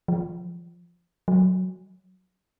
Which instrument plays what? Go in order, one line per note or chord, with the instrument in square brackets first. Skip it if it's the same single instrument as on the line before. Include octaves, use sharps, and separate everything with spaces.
[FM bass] F3
F#3